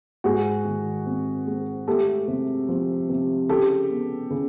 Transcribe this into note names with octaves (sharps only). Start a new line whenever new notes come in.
G#2 F#4 G#4
D#3
C4
G#3
A3 G4 A4
C3
F3
C3
C#3 G4 A4
B3
C#3